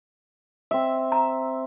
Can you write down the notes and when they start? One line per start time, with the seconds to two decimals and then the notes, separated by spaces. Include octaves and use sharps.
0.71 C4 E5
1.12 A#5